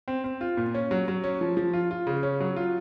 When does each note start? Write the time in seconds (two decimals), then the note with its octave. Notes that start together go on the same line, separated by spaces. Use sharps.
0.08 C4
0.24 C4
0.41 F4
0.57 A#2
0.74 C#4
0.91 F#3
1.08 F#3
1.24 C#4
1.41 F3
1.57 F3
1.73 F4
1.91 F4
2.07 C#3
2.23 C#4
2.40 F#3
2.56 F4